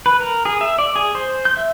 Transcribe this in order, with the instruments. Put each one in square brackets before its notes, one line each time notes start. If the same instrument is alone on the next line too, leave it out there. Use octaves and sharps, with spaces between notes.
[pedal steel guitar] B4
A#4
G#4
E5
D5
G#4
C5
G6
E5